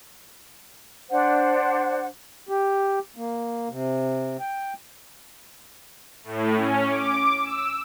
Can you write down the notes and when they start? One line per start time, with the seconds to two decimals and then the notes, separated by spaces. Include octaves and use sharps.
1.10 D4 C5 F#5
2.49 G4
3.16 A#3
3.69 C3
4.40 G5
6.24 A2
6.55 C#4
6.86 D6
7.42 E6